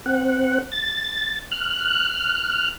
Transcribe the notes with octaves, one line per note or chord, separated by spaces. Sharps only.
C4 F#5
A6
F6 F#6